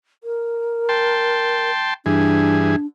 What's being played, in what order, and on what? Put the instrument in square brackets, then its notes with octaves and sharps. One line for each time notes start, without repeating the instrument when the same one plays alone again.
[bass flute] A#4
[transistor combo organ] G5 A5 C6
[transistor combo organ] G2 E3 G#4 [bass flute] D4